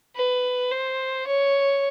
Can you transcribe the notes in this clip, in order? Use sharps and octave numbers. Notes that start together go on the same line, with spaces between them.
B4
C5
C#5